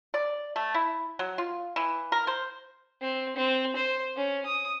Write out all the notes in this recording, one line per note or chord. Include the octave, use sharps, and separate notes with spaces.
D5
A3
E4
F#3
F4
E3
A#4
C5
C4
C4
C5
C#4
D#6